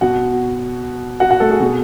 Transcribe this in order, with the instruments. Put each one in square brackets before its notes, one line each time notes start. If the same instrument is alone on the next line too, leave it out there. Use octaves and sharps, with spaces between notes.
[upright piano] B2 F#4 F#5
F#4 F#5
F#4 F#5
A3 A4
G#4
B2